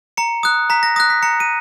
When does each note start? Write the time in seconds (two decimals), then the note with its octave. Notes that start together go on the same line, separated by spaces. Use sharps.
0.17 A#5 C#7
0.43 D#6 F#6
0.70 A#5 B6
0.83 A#6
0.96 D#6 F#6 A#6
1.10 B6
1.23 A#5 C#7
1.40 D#7